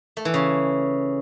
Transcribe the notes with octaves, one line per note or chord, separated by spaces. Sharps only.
A3
E3
C#3